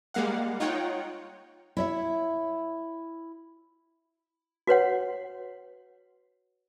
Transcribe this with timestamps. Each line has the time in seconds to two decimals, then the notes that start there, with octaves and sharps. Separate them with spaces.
0.14 G3 G#3 A#3 F5 F#5
0.60 D#4 F4 C#5 F#5 G5
1.77 E4 C#5 E5
4.67 F#4 B4 C#5 F#5